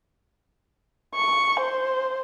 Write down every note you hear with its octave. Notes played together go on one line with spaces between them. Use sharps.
C#6
C5